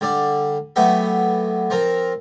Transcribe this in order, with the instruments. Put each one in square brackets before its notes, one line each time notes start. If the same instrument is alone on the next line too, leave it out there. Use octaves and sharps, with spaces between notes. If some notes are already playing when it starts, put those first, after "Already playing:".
[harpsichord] D3 G3 D5
F#3 A3 B3 G4 E5
F3 C4 A#4